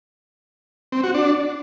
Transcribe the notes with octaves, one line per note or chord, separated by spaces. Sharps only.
C4
F#4
D4